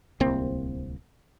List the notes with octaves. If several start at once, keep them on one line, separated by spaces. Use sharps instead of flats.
D1 C2 A#3 C4